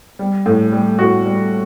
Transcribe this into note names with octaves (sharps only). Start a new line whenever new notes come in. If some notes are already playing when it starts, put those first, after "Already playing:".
G3
A2
G3
A2 F#4
G3